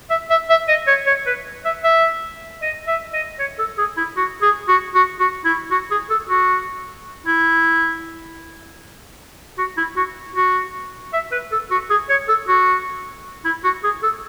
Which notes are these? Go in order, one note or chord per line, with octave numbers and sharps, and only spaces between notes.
E5
E5
E5
D#5
C#5
C#5
B4
E5
E5
D#5
E5
D#5
C#5
A4
G#4
E4
F#4
G#4
F#4
F#4
F#4
E4
F#4
G#4
A4
F#4
E4
F#4
E4
F#4
F#4
E5
B4
A4
F#4
G#4
C#5
A4
F#4
E4
F#4
G#4
A4